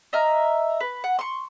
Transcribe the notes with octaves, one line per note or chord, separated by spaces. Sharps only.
D#5 E5 A#5 F6
B4
F#5
C6 C#6